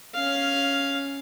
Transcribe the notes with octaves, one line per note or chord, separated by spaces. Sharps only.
C#4 F5